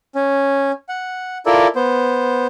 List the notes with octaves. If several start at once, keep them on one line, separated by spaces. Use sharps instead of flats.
C#4
F#5
E4 F4 A4 A#4 D5
B3 C5